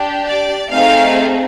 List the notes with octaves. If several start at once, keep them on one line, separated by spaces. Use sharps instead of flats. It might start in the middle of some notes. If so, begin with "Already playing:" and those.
Already playing: D4 G4
D5
A3 C4 D#4 G#4 F5